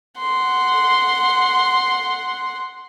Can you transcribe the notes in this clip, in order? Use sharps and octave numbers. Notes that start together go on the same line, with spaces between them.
F#5 C6